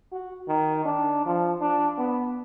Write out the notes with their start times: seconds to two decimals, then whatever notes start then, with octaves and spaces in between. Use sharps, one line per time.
0.12 F#4
0.48 D#3
0.85 D4
1.26 F3
1.61 D4
1.98 B3